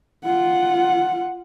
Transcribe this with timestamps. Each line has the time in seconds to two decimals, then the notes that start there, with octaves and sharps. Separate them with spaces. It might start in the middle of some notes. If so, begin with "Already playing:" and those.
0.24 F4 F#5